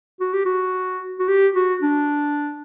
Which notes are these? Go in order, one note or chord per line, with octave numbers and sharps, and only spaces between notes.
F#4
G4
F#4
F#4
G4
F#4
D4